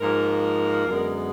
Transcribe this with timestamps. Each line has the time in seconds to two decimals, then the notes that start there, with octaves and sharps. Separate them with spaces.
0.01 G#2 F3 A#3 A#4
0.88 F#2 D3 G#3 B3